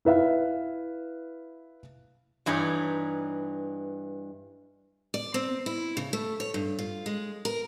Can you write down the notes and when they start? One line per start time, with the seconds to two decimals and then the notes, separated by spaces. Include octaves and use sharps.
0.05 E4 B4 E5 F5
2.46 G2 E3 D#4 C#5
5.14 D5
5.34 C4
5.66 E4
5.97 C#3
6.13 A3
6.40 C#5
6.54 G2
6.79 F4
7.06 G#3
7.45 A#4